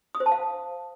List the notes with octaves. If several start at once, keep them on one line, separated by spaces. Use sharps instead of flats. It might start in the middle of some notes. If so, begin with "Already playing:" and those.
D#6
C5
A5
F5